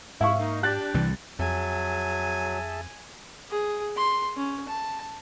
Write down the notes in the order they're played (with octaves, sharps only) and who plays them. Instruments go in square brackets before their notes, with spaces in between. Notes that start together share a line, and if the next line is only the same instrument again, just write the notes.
[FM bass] G#2 [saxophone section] C3 E4 [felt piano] E5 F5 C#6
[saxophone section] A#3 D#4
[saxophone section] D4 G4 [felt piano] F#6 A6
[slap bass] C2 C3 G3 [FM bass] E3
[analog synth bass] F2 [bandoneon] F#3 [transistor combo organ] G#4 E5 A5 [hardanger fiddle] G#5
[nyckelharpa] G#4
C6
C#4
A5